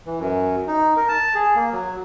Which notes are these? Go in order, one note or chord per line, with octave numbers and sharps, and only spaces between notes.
E3
F#2
D#4
A#4
A5
G#4
A#3
F#3